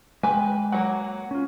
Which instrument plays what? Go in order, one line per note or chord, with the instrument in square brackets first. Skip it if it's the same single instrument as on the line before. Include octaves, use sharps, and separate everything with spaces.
[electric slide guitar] G#3 G5 [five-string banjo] B4 G#5
[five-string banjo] F#3 A#3 [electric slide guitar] C#5 F#5
[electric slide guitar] C#4 F4